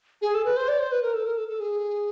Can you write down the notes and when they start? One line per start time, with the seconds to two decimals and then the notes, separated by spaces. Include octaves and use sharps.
0.22 G#4
0.34 A4
0.45 B4
0.57 C5
0.68 D5
0.79 C5
0.92 B4
1.02 A#4
1.14 A4
1.26 A#4
1.37 A4
1.49 A4
1.60 G#4